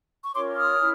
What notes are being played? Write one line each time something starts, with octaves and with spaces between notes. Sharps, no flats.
C#6
C#4 F4 A#4 C#5 C6 D6
D#6 F6
E4